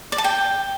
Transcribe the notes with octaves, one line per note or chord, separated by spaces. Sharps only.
D5
A5
G5